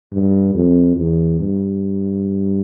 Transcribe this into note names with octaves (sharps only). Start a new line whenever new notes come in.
G2
F2
E2
G2